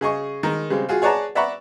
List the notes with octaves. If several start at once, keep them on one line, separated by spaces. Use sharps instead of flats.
C#3 G#4 D#5 C#6
D#3 G#3 A#4
C#3 G3 G#3 C4
F4 F#4 G#4
G#4 C#5 D5 F#5 A5 A#5
D5 E5 F#5 A#5 B5 C#6